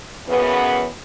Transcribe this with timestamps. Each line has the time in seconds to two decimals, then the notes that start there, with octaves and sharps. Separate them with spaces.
0.25 F#2 C#3 E3 B3